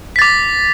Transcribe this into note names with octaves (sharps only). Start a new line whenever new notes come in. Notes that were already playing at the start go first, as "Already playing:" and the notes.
D6 A6 B6